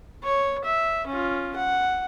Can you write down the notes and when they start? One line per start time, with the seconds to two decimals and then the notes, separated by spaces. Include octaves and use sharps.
0.24 C#5
0.64 E5
1.07 C#4 F4
1.56 F#5